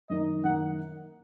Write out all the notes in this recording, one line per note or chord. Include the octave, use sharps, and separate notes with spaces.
F#2 D#3 A#3 D#4 D#5
F#2 D#3 A#3 D#4 F#5